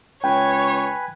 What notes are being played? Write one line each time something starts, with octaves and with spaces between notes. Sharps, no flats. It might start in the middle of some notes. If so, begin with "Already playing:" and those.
C#2 B4 C#5 G5 G#5